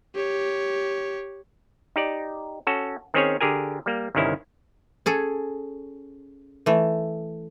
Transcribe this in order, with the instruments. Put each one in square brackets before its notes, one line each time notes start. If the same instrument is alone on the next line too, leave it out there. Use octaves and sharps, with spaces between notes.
[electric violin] G4 C#5
[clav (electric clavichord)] D#4 G4 D5
C#4 F#4 A4
D#3 C4 C#4 G#4 C#5
D3 G4 G#4 A#4 G#5
G3 A#3
G1 C2 D#3 C#4 E4
[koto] C#4 G#4 A4
E3 A3